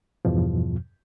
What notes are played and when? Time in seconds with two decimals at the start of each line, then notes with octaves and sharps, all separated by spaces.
0.25 E2 G2 B2 F3